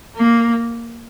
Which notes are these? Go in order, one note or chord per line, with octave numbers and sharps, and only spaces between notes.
A#3